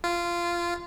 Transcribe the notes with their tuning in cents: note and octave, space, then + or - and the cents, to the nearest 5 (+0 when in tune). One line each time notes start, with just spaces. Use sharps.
F4 -15